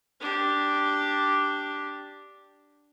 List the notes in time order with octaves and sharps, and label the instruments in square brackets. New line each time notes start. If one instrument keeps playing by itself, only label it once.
[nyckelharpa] D4 G4